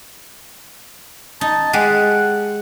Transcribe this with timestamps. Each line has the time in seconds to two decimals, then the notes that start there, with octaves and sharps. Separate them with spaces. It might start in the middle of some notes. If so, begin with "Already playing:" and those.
1.41 D#4 A5
1.73 G#3 G4 F#5